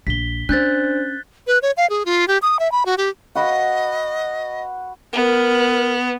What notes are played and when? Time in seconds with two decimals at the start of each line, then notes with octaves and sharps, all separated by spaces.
0.07 A#1 B6 G7
0.49 C#4 D4 C5 F#6 G6 A6
1.47 B4
1.62 C#5
1.77 F5
1.90 G#4
2.06 F4
2.28 G4
2.42 D#6
2.59 E5
2.72 B5
2.86 F#4
2.98 G4
3.36 F#4 B4 D#5 B5
5.13 B3 A#4